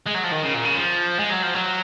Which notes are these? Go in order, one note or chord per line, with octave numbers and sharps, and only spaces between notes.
G#3
F#3
F3
D#3
C#3
A#2
C#3
F3
G#3
F#3
F3
F#3